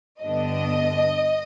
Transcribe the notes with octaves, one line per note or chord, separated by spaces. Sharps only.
G2 D3 G3 B3 D4 D#5